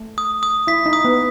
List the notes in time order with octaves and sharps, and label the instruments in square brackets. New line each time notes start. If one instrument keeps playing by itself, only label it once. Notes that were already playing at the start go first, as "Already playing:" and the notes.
Already playing: [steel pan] A3
[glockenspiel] D#6
D#6
[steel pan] E4 [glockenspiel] B6
[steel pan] D#4
[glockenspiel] D#6
[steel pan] B3